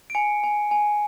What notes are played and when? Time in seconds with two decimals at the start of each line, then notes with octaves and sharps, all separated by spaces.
0.10 D7
0.15 G#5 C#7
0.44 G#5
0.71 G#5